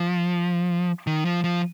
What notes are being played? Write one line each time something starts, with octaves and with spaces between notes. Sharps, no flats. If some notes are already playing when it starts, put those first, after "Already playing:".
Already playing: F3
D#3
F3
F3